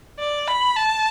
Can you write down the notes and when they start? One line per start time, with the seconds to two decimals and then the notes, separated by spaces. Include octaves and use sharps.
0.19 D5
0.48 B5
0.76 A5